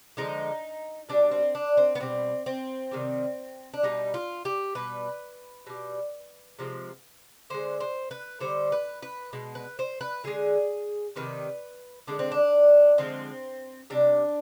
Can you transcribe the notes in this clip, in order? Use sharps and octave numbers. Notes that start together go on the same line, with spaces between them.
D3 F3 G#3 D#4
B2 G3 D4
C4
D4
C4
B3
B2 G3 C4
C4
C3 D#3 G3
D4
B2 G3 D#4
F4
G4
B2 G3 B4
B2 G3
C3 F3 G#3
D3 G#3 C5
C5
B4
D3 G3 C5
B4
B4
B2 G#3
B4
C5
B4
D3 G#3 G#4
C3 D#3 G3 B4
D3 G#3 D4
C4
D4
D3 F3 G#3 C4
C3 G3 D4